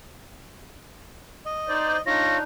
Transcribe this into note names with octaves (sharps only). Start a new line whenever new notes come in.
D#5
D#4 C5 D5
D4 D#4 F4 C#5 A#6